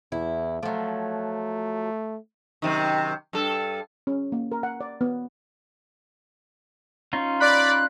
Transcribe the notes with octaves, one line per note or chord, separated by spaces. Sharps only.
E2 E4
F3 F#3 A3
F#2 C3 D#3
G2 A4
C#4
A#3
A#4
F#5
D5
B3
C#4 D#4 F4
D5 B5 F#6